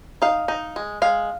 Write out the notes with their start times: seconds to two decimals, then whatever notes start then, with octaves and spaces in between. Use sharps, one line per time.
0.22 D#4 F5
0.48 D#4
0.76 G#3
1.02 G#3 F5